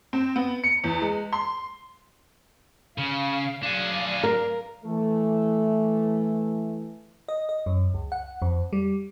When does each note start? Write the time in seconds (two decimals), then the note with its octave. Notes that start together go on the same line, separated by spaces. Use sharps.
0.13 C4
0.36 B3
0.64 C#7
0.84 E2
1.02 G#3
1.33 C6
2.98 C#3 F5
3.63 F#3 D4 G#4 D5 F5
4.23 A#4
4.85 E3 A3
7.28 D#5
7.49 D#5
7.66 F#2
7.94 C#2
8.12 F#5
8.42 F2
8.73 G3